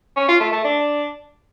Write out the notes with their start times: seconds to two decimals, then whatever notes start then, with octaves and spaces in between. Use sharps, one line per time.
0.17 C#4
0.29 F4
0.41 A3
0.52 A3
0.64 D4